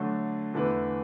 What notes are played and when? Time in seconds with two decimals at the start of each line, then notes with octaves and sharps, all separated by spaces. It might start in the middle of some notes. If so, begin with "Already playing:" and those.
Already playing: D3 F#3 A3
0.54 E2 D3 A3 E4 B4